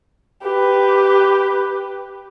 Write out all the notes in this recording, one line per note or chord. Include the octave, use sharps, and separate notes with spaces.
G4 B4